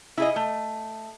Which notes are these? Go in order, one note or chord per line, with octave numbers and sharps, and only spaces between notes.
E4 G#4 D#5
A3